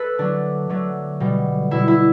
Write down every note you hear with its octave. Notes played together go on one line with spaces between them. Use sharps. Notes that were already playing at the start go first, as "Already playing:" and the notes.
Already playing: A4 B4
D3 F#3 A3 D4
D3 F#3 A3
B2 G3
B2 G3 E4
E4